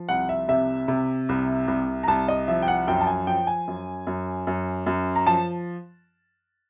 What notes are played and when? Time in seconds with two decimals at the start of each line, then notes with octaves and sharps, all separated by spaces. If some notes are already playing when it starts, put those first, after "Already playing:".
Already playing: F3
0.09 C2 F#5
0.29 E5
0.48 C3 E5
0.88 C3
1.29 C2
1.68 C2
2.03 A#5
2.08 C2 A5
2.28 D#5
2.48 F3 E5
2.62 G5
2.68 F#5
2.88 F#2 G5
3.01 A5
3.07 G#5
3.27 F3 G5
3.47 G#5
3.68 F#2
4.07 F#2
4.47 F#2
4.86 F#2
5.16 A#5
5.26 F3 A5